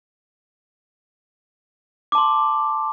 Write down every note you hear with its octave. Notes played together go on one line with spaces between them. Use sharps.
A5 C6 D6